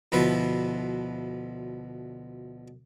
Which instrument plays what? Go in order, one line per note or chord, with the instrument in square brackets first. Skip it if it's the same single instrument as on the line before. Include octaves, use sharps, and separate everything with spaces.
[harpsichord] D2 B2 F3 E4 B4